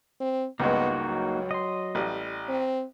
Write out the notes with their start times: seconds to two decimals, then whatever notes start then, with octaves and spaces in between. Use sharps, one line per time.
0.21 C4
0.60 C#2 G2 G#3 A#3 B3 D#4 F#4
1.10 F#3
1.51 D#5 C6
1.95 A1 G3
2.49 C4